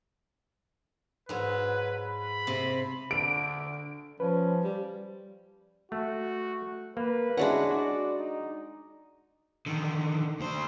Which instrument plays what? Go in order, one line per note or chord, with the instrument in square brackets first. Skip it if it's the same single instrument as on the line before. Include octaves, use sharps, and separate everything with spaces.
[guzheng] G#2 F#3 [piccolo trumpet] B4
[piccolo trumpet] B5
[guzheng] C3
[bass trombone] D3 [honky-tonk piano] D7
[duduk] F3 [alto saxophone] C#4 [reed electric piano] B4
[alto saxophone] G3
[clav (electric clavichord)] A3 [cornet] F#4
[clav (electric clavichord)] A#3 [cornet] B4
[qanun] G#3 D4 F#5 [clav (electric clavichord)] C#4 E4 F#4
[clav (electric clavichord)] F#4 [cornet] D5
[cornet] D#4
[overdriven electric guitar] D3 D#3
D2 C5